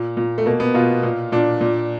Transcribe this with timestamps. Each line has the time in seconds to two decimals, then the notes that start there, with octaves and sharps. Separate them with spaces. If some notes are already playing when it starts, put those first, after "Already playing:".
Already playing: A#2
0.17 A#2
0.38 A3
0.46 B2 A#3
0.60 B3
0.74 B2 F4
1.03 A#2
1.32 A#2 D4
1.61 A#2